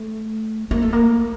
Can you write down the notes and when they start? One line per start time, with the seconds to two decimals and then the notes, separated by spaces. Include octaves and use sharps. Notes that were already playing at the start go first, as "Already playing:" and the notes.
Already playing: A3
0.71 A#3
0.82 A3
0.93 A#3